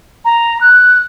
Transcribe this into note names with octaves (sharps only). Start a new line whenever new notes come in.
A#5
F#6